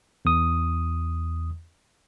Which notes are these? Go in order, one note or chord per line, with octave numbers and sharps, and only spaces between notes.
E2 D#6